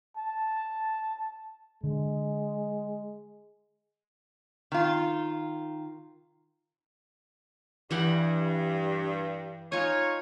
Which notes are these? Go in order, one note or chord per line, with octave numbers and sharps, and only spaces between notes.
A5
D3 G#3
D#3 F4
G2 E3 G4 F#5
D#4 F4 C#5 G#5